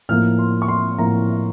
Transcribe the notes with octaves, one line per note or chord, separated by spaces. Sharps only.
A2 F3 A#3 F6
C6
C#6
C6
A2 F3 A#3 A#5